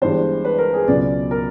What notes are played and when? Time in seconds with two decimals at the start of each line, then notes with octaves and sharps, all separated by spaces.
0.01 G1 G2 E3 G#3 C5
0.45 B4
0.58 A#4
0.73 G#4
0.88 C#2 B2 F#3 D5
1.31 A#4